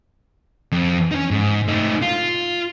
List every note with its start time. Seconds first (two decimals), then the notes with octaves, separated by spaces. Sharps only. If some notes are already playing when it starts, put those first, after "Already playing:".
0.72 F2
1.11 C#4 D#4
1.31 G#2
1.68 A3 D#4
2.02 F4